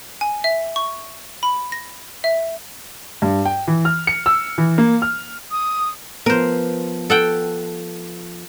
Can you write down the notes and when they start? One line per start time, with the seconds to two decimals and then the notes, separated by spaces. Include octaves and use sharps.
0.21 G#5
0.44 E5
0.76 C#6
1.43 B5
1.72 A#6
2.24 E5
3.22 G2
3.45 G5
3.67 E3
3.85 F6
4.07 C#7
4.26 E6
4.58 E3
4.78 A#3
5.02 F6
5.50 D#6
6.26 F3 B3 A#4 C5
7.10 A4 F#5 G5